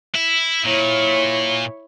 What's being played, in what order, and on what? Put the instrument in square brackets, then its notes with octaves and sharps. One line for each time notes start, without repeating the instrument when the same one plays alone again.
[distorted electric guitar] E4
[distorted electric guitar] A#2 [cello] E4 C#5